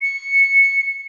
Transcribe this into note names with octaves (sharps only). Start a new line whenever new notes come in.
C#7